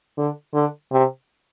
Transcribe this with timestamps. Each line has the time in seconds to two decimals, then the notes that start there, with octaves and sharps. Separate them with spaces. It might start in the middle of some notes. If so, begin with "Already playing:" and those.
0.18 D3
0.54 D3
0.92 C3